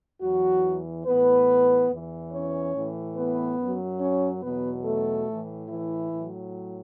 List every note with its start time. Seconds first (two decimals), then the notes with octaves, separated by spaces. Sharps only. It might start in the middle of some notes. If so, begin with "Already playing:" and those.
0.22 E2 E3 F#3 F#4
1.06 A2 E3 B3 B4
1.90 E2 E3
2.33 C#4 C#5
2.75 A2 E3
3.17 B3 B4
3.59 F#2 F#3
4.00 C#4 C#5
4.42 E2 B2 F#3 B3 B4
4.85 A3 A4
5.27 A2 E3
5.69 E3 E4
6.11 A2 F#3